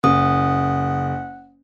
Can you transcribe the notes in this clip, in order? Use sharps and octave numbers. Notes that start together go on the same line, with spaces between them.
F#1 F#5 D#6